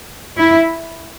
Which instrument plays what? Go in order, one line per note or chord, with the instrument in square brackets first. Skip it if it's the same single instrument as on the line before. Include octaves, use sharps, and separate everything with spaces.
[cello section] E4